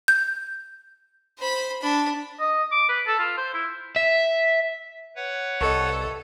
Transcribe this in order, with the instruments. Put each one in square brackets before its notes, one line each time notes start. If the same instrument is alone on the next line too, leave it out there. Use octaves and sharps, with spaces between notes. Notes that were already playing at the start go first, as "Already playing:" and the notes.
[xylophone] G6
[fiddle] C5 B5
D4 B5
[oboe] D#5
D6
B4
A4
F4
C5
E4
[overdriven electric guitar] E5
[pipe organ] B4 C#5 F#5
[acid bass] C2 [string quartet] A4 [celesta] D#5 C#6